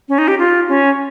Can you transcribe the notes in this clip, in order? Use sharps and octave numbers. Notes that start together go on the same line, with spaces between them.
C#4
D#4
G4
F4
C#4